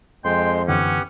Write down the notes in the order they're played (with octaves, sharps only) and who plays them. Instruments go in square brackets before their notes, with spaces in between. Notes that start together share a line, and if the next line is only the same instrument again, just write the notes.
[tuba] F2 [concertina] G#3 C6 [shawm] G5
[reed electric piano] F#2 D3 E3 [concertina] B3 G4 F#5 [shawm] C#4